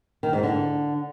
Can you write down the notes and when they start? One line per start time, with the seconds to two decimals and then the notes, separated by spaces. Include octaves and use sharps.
0.23 D#3
0.33 G#2
0.43 D3